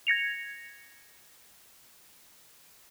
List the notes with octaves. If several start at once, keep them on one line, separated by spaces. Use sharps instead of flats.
G#6 A#6 C#7 F7